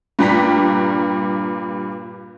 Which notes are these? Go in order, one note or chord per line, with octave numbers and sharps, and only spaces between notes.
G2 A#2 G3 G5 A#5 B6